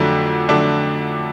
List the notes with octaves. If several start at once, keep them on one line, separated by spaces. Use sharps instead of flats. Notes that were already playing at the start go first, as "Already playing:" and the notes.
Already playing: F2 D3 F#3 A3 D4
F2 D3 F#3 A3 D4